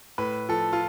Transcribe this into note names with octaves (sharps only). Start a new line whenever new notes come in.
A2 B4
F3 A4
F4